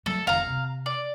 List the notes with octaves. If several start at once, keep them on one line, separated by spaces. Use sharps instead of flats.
F#3 A3 A4
F1 D#3 F5 A#5
C3
D5